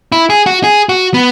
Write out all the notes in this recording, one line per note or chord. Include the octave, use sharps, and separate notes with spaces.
E4
G#4
F#4
G#4
F#4
B3